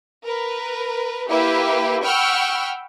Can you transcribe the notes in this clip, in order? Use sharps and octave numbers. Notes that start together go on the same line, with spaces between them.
A#4 B4
A#3 E4 G4 B4
F#5 G5 B5 C#6 E6 F6